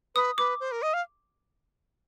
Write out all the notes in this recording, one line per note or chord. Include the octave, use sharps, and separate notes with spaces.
B4 D#6
B4 D6
C5
A#4
D#5
F5